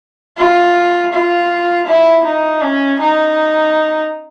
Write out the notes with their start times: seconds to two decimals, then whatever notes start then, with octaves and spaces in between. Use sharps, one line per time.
0.38 F4
1.13 F4
1.87 E4
2.25 D#4
2.61 C#4
3.00 D#4